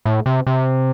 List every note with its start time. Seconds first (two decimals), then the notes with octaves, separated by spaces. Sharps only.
0.05 A2
0.26 C3
0.47 C3